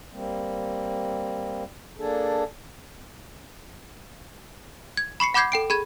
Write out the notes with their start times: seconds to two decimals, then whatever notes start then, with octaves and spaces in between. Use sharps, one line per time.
0.12 G3 A#3 C4
1.98 A#3 D4 G#4 A4
4.97 G#6
5.20 B5 C#6 C7 C#7
5.34 F#5 B5 D6 G6 G#6 C7
5.52 A4 G5 D7
5.70 G#4 B5 G#6